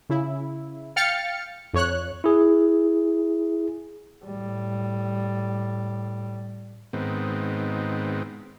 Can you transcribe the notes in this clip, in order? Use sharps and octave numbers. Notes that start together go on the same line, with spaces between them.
C#3 E4
F5 G5 F6 A6 C#7
F2 C#5 F#6
E4 G#4
A2 G3
G#2 D#3 B3 C4